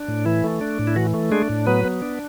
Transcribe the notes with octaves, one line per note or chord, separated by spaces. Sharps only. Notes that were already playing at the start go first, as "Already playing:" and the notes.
Already playing: D4
A2
E3 E4
A3
D4
A2
E4
E3 F#4
A3
G#3 D4 G#4
A2
F#3 B3 B4
B3
D4